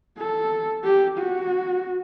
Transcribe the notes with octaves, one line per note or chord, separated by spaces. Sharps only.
A4
G4
F#4